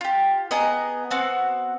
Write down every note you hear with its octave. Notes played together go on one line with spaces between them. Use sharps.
F4 G4
B3 G#4 D#5 A#5
B3 C4 F#4